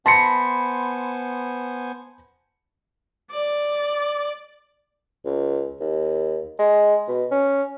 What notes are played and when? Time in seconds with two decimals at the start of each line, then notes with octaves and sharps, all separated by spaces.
0.06 B3 C5 G#5 A5 B5 C6 A#6 C#7
3.31 D5
5.25 C#2
5.80 D#2
6.59 G#3
7.08 B2
7.31 C#4